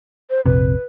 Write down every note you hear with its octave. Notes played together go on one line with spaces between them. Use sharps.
C5
F1 A#1 C3 B4